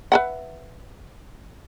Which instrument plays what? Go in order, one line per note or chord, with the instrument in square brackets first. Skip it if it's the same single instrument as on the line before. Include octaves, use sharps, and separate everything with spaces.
[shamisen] B4 E5 F#5